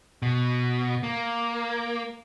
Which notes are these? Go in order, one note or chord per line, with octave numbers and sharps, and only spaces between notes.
B2
A#3